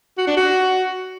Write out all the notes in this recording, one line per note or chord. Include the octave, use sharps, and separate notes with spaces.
F#4
D4
F#4